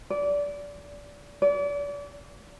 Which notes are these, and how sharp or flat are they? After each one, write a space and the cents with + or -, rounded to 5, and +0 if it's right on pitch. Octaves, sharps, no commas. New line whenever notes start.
D5 -25
D5 -35